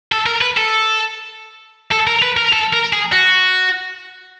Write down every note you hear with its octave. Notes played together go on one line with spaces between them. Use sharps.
A4
A#4
B4
A4
A4
A#4
B4
A#4
A4
A#4
G#4
F#4